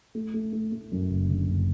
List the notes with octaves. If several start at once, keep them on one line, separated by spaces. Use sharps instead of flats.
A3
A3
A3
A3
F#2
F#1
D3
F#1